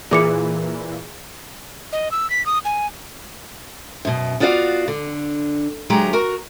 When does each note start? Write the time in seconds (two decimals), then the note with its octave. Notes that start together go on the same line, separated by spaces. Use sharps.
0.11 A#2 E3 G#4 D6 C#7
1.92 D#5
2.11 E6
2.30 B6
2.46 D#6
2.65 G#5
4.05 F#2 B2
4.40 B3 F4 F#4 D5 E5 F5
4.88 D3
5.90 D2 F#3 G#3 G4 A#5
6.13 F#4 A#4